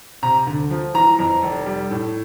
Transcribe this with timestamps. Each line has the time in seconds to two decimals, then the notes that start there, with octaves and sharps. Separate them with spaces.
0.23 C3 A#5
0.47 D2
0.70 F3
0.94 E3 A#5
1.19 F2
1.43 F1
1.66 G3
1.91 A2